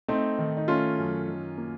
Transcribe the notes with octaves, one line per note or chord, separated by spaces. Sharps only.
A3 C4 D#4
D#3
D#4
A3 C#4 F4
F#2
D#3
A#3